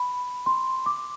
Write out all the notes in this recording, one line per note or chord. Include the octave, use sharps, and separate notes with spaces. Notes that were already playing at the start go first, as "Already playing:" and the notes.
Already playing: B5
C6
D6